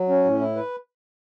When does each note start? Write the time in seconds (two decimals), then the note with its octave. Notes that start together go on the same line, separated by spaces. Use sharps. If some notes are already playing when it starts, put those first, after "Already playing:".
Already playing: F#3
0.09 C#4
0.24 A2
0.40 E4
0.56 B4